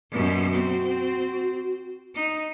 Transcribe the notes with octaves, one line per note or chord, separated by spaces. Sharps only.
F#2 B2
C4 F#4
D#4